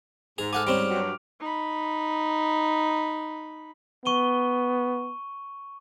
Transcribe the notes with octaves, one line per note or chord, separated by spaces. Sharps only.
G#2 G#4 F7
A4 F#5 G#5 D6 F6
G3 C4 C#4 D7 F7
G2 F#3
D#4 B5
B3 C#6 D#7 G7